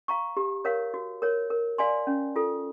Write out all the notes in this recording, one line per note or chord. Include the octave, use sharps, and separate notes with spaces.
F5 A#5 C#6
G4
A#4 C#5 F5
F#4
A#4 C#5
A#4
D5 F5 G#5 C6
C#4
F4 A4